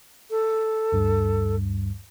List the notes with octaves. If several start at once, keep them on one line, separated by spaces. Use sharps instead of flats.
A4
D2 G2 G3